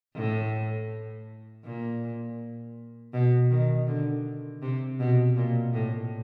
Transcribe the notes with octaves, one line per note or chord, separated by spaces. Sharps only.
A2
A#2
B2
D#3
D3
C3
B2
A#2
A2